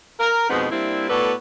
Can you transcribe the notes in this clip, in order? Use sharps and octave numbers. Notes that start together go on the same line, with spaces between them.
A#4
F2 B2 G#3 B3 C4 D#4
G3 A#3 C4 D4 E4
A2 B3 F#4 A4 B4 D5